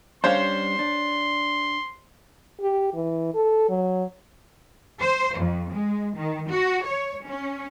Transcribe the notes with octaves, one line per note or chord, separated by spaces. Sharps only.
G3 C#4 D4 C5 C#5 F5 C6
D4
G4
E3
A4
F#3
C5
F2
G#3
D#3
F#4
C#5
C#4